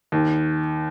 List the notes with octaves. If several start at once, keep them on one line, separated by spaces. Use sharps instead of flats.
D#2